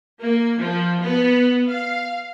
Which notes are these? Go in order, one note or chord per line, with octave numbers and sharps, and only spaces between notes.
A#3
F3
B3
F5